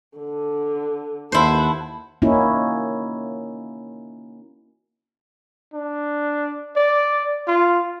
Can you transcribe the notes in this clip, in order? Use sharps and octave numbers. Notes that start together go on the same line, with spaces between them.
D3
D#2 E4 C5 F#5 A5
A#3 C#4 D#4 E4 F#4
D4
D5
F4